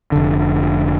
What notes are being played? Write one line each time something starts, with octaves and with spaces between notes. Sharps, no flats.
F1 D3